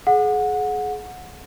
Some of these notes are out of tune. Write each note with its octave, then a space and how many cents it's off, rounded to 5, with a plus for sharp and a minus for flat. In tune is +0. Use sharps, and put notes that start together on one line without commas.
G#4 +30 F#5 -20